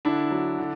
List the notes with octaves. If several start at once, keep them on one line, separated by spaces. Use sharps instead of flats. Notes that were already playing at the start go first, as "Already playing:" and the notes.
D3 D4 E4
F#3
D3